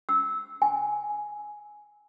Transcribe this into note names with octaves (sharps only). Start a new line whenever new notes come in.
E6
G#5